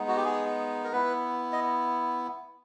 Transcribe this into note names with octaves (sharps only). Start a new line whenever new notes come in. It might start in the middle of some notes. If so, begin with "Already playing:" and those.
Already playing: G#3 B3 D#4
F#4
G4
G#4
A#4
B3 E4 B4
D#5